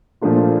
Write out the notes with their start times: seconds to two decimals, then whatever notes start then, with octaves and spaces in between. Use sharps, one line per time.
0.21 A#2 F3 A3 D4 F4